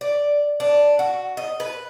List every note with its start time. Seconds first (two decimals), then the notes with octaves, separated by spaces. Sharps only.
0.01 D5
0.60 D4
0.99 F#4
1.37 D#5
1.60 B4